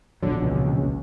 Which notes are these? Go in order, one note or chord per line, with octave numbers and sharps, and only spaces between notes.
E1 A#1 D3 F#3
C#2